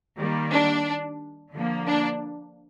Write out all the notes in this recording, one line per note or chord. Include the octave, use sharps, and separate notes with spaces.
D#3 G3 A#3
D4
D3 F3 A#3
D4